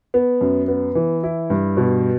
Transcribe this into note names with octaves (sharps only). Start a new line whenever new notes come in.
B3
F#2
B3
E3
E4
G2
B2